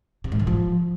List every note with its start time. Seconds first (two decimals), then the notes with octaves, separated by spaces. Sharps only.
0.24 C3
0.32 G#2
0.39 D#3
0.47 F3